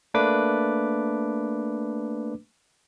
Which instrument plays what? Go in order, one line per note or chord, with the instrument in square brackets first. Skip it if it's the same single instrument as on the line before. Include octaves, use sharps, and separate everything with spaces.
[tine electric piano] A3 A#3 D4 B4 D6